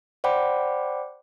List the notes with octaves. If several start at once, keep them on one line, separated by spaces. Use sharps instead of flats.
C5 D5 F#5 G5 B5 D6